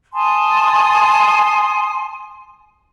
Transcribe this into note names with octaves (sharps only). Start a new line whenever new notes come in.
G#5 A5 C6 D#6